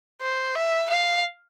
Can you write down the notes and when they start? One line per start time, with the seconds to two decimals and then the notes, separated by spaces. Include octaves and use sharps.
0.21 C5
0.55 E5
0.89 F5